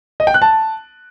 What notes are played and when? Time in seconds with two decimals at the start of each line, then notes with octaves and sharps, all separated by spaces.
0.20 D#5
0.27 G5
0.34 F#6
0.42 A5